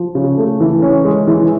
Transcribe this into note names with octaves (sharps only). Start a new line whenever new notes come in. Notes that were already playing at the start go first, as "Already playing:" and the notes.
Already playing: F3
C#3
A3
E3
C#4
G#3
E3